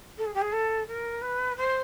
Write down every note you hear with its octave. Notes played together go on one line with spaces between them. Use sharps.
A4
G#4
G4
G#4
A4
A#4
B4
C5